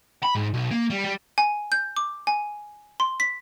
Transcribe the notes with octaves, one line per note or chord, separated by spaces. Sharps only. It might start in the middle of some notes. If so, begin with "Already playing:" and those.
B5
G#2
B1
A#3
G3
G3
G#5
G6
D6
G#5
C6
B6